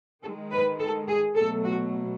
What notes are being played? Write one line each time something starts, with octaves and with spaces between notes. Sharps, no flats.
D#3 G#3 A4
B4
A4
G#4
B2 F#3 A3 A4
F#4